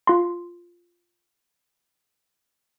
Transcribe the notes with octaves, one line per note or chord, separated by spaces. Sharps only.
F4 C6